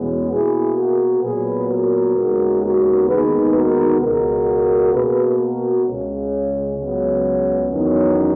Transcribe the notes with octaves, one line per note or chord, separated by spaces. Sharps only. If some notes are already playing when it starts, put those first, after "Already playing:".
Already playing: E2 B2 G#3 B3 C#4
B2 A#3 E4 G#4
F#4 A#4
A#2 F#3 B3 G#4 B4
F#4 A#4
D#2 C#3 G#3 B3
F#4 A#4
D#2 D#3 G#3 B3 G#4 B4
F#4 A#4
C#2 B2 G#3 F#4 A#4
B2 A#3 G#4 B4
F#4 A#4
C#2 C#3 G#3 C#4
C#2 C#3 F#3 B3 C#4
E2 D#3 F#3 B3 C#4